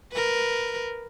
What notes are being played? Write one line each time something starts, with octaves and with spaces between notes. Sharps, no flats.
A#4 B4